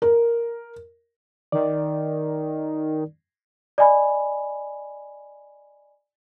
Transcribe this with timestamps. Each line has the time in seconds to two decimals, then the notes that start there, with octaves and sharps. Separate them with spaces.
0.02 A#4
1.52 D#3 D5
3.78 D5 D#5 G#5 B5